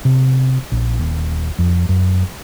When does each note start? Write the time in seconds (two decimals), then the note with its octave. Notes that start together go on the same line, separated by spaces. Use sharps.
0.05 C3
0.72 A#1
0.99 D#1
1.59 F2
1.89 F#2